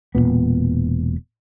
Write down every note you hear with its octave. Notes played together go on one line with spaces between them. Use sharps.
E1 D#2 A#2 B3